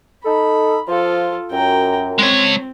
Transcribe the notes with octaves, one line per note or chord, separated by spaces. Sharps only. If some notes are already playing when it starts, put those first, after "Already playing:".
D#4 A4 B5
F3 F4 A4
F#2 G5 A#5
G#3 C4 C#5